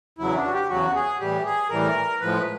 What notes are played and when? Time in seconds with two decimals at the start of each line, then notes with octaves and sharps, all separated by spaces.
0.18 E2 C#3 F#3 E4
0.35 D4
0.45 F#4
0.52 G4
0.69 E2 C#3 F#3 F#4
0.95 G#4
1.20 A2 E3 G3 G4
1.45 G#4
1.70 A2 E3 G3 A#4
2.21 A2 F3 G#3 B4